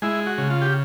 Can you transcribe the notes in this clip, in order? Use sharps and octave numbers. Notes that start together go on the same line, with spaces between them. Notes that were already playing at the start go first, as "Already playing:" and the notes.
G#3 E4
F#4
C#3
F4
G4